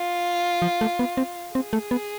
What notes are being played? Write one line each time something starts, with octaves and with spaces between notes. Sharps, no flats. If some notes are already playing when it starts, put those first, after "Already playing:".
Already playing: F4
F3
A3
B3
C4
C4 G#4
A3
B3